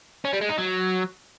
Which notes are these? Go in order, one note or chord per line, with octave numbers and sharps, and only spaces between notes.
C#4
G3
G#3
D#4
F#3